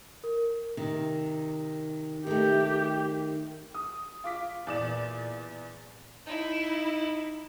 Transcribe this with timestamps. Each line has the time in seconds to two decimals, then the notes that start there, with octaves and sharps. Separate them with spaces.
0.24 A#4
0.77 C3 D#3
2.27 D#3 A3 G4
3.74 D#6
4.24 F4 D6 B6
4.67 E2 A#2 D5 E7
6.27 D#4 E4